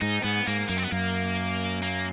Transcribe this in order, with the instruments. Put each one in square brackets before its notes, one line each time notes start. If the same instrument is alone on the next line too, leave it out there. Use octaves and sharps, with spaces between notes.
[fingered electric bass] G#2 [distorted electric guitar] D#4
[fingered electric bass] G#2 [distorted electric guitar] B3
[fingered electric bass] G#2 [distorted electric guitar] A#3
[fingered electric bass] F#2 [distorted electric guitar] A#3
[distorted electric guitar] C4
B3
[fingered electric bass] F#2 [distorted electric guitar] A#3
[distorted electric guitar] A#3